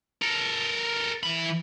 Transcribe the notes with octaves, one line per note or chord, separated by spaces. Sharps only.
A4 A#4
E3 B5